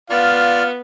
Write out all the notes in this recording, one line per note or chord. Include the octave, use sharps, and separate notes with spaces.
B3 F4 D5 F5 F6